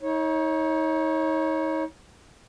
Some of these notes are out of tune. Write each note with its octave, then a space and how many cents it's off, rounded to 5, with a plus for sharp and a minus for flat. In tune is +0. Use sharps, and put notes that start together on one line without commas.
D#4 +35 C#5 -10